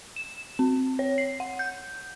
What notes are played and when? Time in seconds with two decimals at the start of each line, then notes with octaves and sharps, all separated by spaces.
0.16 E7
0.59 C4
0.99 C#5
1.18 C7
1.40 F#5
1.59 G6